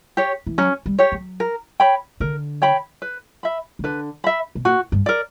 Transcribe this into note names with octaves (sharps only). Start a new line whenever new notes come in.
G4 C#5
E3
F#3 C#4
G3
G4 C#5
F#3
A#4
C#5 G5 B5
D3 A#4
C#5 G5 B5
B4
E5 B5
C#3
D3 B4
E5 B5
B2
A#2 F#4
G2
A#4 D5